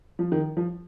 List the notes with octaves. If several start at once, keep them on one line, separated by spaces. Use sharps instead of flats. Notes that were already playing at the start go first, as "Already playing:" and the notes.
F3
D#3
F3